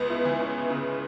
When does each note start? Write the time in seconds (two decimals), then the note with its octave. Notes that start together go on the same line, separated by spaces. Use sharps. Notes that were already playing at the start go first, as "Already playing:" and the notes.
Already playing: C#2 B3
0.10 E4
0.25 E3
0.40 C#4
0.70 C#3